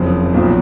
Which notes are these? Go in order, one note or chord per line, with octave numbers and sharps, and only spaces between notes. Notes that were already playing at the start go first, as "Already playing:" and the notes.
Already playing: F#1 F2 F3
B1 A#2 F3